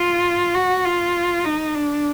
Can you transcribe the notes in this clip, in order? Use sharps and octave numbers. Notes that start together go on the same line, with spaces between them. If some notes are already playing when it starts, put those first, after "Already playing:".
Already playing: F4
F#4
F4
D#4
D4